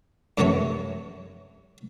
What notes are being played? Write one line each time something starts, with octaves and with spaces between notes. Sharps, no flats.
F#2 C3 E3 A3 F#4 C#5